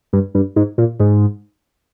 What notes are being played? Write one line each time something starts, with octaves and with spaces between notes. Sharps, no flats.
G2
G2
G#2
A#2
G#2